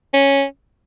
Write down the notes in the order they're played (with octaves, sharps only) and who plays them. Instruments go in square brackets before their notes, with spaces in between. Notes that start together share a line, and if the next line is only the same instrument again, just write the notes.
[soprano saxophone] C#4